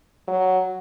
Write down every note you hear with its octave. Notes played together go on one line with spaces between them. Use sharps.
F#3